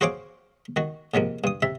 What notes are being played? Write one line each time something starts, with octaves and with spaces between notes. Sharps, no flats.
F#4 G#4 C5 C#5 F5 D6
D#3 F#4
G#2 C3 F3 A#3
G2 D#6
C3 E5